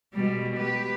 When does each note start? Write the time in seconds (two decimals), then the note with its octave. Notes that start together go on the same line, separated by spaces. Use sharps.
0.13 B2 G3 G#3
0.55 G4 B4